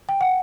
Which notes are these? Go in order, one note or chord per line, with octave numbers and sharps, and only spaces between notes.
G5
F#5